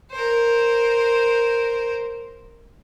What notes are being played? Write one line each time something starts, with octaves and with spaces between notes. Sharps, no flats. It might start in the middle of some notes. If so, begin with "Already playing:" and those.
A#4 C5